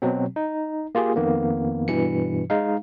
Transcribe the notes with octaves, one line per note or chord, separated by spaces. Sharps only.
B2 F#3 C4
D#4
A#3 F4 G4 G#4
F2 D#3 A#3 B3
G2 B2 E3 C#7
G#3 D#4 F5